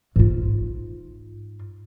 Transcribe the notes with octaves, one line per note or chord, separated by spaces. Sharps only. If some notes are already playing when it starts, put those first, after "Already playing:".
G#2 F4